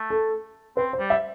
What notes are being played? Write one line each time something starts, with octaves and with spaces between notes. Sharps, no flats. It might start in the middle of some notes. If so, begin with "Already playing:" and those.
Already playing: A3
A4
C4 B4
C5
G3
E5